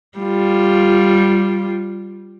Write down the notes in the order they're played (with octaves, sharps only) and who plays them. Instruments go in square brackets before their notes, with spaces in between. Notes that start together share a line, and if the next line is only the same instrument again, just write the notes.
[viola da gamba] G3 F4